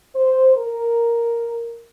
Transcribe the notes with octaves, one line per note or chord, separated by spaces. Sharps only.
C5
A#4